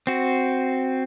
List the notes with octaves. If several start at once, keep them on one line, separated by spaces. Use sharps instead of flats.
C4 F#4